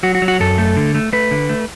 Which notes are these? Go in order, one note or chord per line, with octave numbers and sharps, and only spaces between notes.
F#3 F#4
F#4
F#3
F#4
F#2 A4
A3
D3
A3
A3 B4
D3
A3